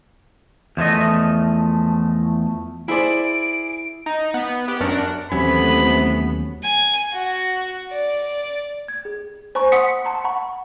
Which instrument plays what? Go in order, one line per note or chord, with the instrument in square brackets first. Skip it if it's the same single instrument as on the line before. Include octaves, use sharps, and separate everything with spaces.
[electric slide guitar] E2 F3 A3 D#5
[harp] E4 [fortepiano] G#4 C5 D5 [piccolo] D7
[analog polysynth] D#4
B3
B3 G4
F#2 F#3 D4 A#4 F#5
[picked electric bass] D#2 F#3 C#4 [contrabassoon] C3 [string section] E3 A3 B3 [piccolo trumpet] B5
[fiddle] G#5
F#4
D5
[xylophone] G#6
G#4
C5 G#5 A#5 B5 C#6
F#5 C6 D#6 E6 B6 C#7
A5 A#5 C6
F#5 A#5 B5 C#6